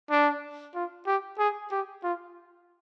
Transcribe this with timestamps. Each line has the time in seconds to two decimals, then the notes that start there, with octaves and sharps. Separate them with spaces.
0.10 D4
0.75 F4
1.07 G4
1.39 G#4
1.71 G4
2.03 F4